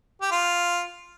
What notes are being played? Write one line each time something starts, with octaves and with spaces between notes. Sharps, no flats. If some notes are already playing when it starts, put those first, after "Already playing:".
G4
F4